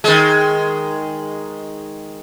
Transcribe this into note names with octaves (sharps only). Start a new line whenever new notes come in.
D#3 G#3